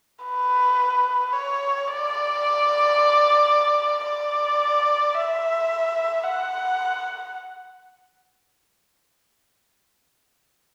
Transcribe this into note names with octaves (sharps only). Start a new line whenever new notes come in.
B4
C#5
D5
D5
E5
F#5